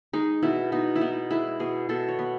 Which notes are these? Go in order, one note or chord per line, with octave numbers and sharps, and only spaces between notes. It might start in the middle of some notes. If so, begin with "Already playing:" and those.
G#3 D#4
B2 E4
B2 D#4
E4
B3 D#4
G#3 E4
B2 G#4
B2 A4
C#5
B3